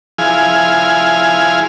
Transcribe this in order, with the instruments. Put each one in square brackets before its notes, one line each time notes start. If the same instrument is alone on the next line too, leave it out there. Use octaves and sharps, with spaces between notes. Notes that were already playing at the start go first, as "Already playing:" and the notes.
[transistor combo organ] F3 E4 G#4 G#5 F6